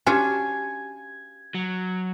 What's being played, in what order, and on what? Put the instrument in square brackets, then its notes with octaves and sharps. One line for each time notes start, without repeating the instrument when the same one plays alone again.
[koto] C#4 D4 [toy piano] F#4 G4 [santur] G#5
[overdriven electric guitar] F#3